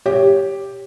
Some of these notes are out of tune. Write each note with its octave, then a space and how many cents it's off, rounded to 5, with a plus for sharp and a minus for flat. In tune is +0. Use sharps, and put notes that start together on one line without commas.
G4 +0 C#5 +0